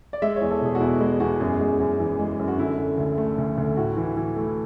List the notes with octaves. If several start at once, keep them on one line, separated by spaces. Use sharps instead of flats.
D5
G#3 E5
C#5
E2
A4
B2 G#4
F#4
E2 E4
G#3 E4
E2 F#4
F#2 G#4
G#3
F#2
E3
G#3
F#2
F#4
D3 E4
D3
D2
A3
D2
D2
A2 F#4
E3
E3
A3 E4